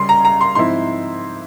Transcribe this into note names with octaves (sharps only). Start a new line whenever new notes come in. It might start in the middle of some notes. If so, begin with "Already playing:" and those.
Already playing: C#3 G3 C#4 C6
A#5
A#5
C6
G#2 F3 C4 E4 C6